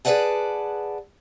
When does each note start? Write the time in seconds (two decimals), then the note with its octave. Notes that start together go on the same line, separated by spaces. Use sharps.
0.05 G#4 B4 C#5 D5 F#5 A5